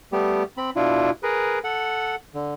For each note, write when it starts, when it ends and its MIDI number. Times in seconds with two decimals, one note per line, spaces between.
0.12 0.43 55
0.12 0.43 57
0.12 0.43 59
0.12 0.43 67
0.57 0.70 60
0.57 0.70 83
0.76 1.11 47
0.76 1.11 62
0.76 1.11 64
0.76 1.11 65
1.23 1.59 68
1.23 1.59 70
1.23 1.59 71
1.64 2.15 69
1.64 2.15 78
2.34 2.54 50